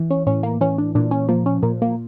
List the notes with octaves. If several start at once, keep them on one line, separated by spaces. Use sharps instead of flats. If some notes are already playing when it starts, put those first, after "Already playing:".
Already playing: E3
C#4
A2 C#4
A#3
E3 C#4
D4
A#2 D4
C#4
F3 A#3
C#4
A#2 A#3
A#3